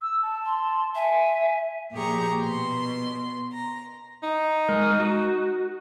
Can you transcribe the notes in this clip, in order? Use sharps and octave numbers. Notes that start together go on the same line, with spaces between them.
E6
A5
C6
E5 G#5
A#2 F3 G4 G#4 A#5 C#6
B2 C6
A#5
D#4
G#3 A#4
F#4